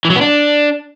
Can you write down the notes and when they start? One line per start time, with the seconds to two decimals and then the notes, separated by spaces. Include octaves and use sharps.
0.05 E3
0.10 F#3
0.16 B3
0.21 D4